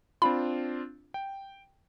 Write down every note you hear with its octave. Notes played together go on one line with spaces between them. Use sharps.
C4 D4 F4 B5
G5